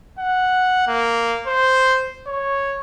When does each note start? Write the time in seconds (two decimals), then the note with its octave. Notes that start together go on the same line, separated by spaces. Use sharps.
0.18 F#5
0.87 A#3
1.47 C5
2.27 C#5